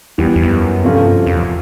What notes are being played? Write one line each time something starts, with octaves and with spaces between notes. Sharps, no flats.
E2 E3 G3 B3
E2
F2
F#2
G2 C3 F3 A3 C#4 F4
F#2
F2
E2